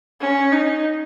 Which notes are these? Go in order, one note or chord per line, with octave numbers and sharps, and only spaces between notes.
C#4
D#4